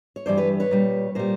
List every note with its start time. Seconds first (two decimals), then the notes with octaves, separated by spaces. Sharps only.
0.16 C#5
0.26 G2 E3 G3 C5 D5
0.37 B4 C#5
0.60 B4 C#5
0.71 A#2 G3
1.15 A#2 G3 A#4 C5